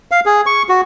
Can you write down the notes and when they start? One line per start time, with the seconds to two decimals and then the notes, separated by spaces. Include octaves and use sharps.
0.11 F5
0.26 G#4
0.46 C#6
0.69 F#4